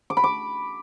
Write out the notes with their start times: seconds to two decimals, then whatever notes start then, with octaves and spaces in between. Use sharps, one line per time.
0.10 D6
0.17 B5
0.24 D6